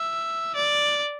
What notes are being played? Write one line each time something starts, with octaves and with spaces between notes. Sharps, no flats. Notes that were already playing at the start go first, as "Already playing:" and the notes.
Already playing: E5
D5